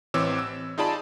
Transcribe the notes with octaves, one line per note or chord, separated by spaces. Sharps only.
A1 E3 C4 C#5 D6 E6
E6
D#4 F4 G#4 D5 A5 B5